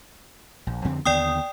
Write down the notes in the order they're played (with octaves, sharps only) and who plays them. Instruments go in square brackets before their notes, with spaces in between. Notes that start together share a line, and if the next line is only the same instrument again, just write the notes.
[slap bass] A#1
F2 D3 C4
[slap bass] D#2 D3 B3 [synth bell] D5 G5 D#6